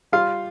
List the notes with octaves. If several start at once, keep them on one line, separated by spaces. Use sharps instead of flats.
G3 F4 F5